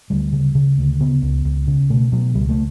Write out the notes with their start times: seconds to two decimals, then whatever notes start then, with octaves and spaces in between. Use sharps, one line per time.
0.10 D2 G3
0.33 C#3
0.55 C#3
0.78 D2
1.00 C#3 B3
1.22 C#2
1.45 C#2
1.67 C#3
1.90 B2 A3
2.12 B2 F#3
2.34 C#2 G3
2.49 A3